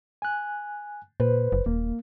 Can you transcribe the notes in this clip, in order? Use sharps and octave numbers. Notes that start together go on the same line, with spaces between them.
G#5 F#6
A#2 B4 C5
F#1
D#1 A#3